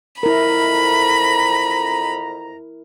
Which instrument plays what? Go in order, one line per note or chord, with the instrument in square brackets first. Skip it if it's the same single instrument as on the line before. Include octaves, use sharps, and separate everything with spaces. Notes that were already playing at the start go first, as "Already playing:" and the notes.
[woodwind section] F2 A#5 [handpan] E4 A#4 [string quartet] B5